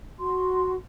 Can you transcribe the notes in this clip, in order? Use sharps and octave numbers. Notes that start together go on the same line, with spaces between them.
F#4 C6